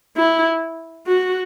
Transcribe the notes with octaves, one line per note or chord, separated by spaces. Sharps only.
E4
F#4